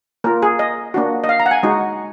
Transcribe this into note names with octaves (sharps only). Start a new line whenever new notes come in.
A#3 F4 A#4
G#4
D#5
A#3 D4 F#4
D#5
F5
A#5
F#5
G#5
G#3 D#4 F#4